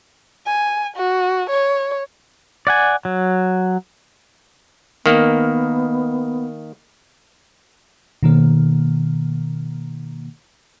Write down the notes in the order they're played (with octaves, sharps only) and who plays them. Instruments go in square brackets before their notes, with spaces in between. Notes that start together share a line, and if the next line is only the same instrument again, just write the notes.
[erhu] G#5
F#4
C#5
[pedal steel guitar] D5 F#5 G#5
F#3
[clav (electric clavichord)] D#3 A#3 [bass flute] B3
[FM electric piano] B2 D#3 A#3